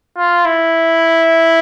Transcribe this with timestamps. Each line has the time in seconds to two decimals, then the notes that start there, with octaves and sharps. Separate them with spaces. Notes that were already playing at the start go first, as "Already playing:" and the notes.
0.17 F4
0.45 E4